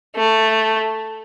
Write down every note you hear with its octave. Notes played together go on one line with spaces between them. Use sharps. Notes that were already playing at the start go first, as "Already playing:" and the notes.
A3